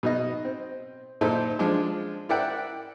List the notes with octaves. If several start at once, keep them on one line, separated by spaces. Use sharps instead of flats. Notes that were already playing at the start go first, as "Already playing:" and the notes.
B2 D#4 D#5
C4
A#2 D#4 E4 A4 C5
F3 G#3 D4
E4 A#4 D5 E5 F#5 G5